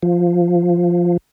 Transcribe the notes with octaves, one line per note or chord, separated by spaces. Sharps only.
F3